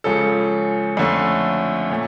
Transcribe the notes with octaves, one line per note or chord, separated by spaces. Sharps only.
C#2 C#3 F3 C#4 A4
F2 D3 A3 C#4
A#2 A3 C#4